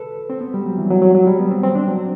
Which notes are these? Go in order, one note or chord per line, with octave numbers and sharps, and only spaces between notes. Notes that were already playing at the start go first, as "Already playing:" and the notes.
Already playing: A4 B4
C4
B3
G3
F#3
E3
F#3
F#3
F#3
G3
B3
C4
C4
D4
F#3